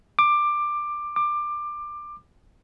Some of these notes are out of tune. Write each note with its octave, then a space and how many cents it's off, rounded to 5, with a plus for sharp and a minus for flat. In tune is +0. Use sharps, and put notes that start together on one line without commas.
D6 +15
D6 +20